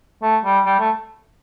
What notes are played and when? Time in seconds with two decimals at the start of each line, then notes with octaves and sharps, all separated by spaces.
0.22 A3
0.44 G3
0.65 G3
0.80 A3